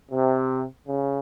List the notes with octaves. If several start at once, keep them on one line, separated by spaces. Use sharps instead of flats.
C3
C#3